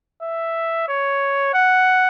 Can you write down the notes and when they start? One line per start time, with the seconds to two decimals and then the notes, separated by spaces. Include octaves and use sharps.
0.22 E5
0.88 C#5
1.54 F#5